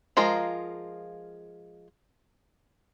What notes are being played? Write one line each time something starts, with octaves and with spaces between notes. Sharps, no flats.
F3 G#3 F4 A#4